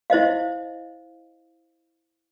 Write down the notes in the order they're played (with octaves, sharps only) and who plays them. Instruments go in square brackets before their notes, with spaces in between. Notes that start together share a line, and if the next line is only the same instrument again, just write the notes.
[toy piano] E4 C5 D#5 F5